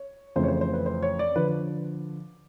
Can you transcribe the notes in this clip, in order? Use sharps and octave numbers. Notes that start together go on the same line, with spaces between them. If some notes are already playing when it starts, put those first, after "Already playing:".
Already playing: C#5
F2 C#3 E3 A3 C5
C#5
C5
C5
B4
C5
C#5
D5
D3 F3 B4